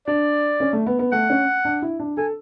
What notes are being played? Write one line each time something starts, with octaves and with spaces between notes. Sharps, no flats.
D4 D5
C#4
A3
B3
B3
A3 F#5
C#4
D4
E4
D4
A4 G#5